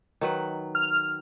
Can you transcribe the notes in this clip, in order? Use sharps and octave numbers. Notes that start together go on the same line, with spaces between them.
D#3 F#3 B4
F6